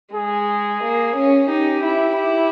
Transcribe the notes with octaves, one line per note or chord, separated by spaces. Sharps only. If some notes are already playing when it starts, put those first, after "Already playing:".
G#3 G#4
A#3
C#4
D#4 G4
E4
E4